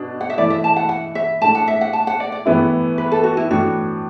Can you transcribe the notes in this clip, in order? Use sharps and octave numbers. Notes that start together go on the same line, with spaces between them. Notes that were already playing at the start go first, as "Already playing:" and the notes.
Already playing: B2 D4
F#5
E5
E3 A3 E4 D5
E5
A5
F#5
F#5
E5
A2 A3 D4 A5
F#5
E5
F#5
A5
F#5
D5
D5
A2 E3 B3 E4 D5
B4
A4
F#4
E4
A2 E3 D4 F#4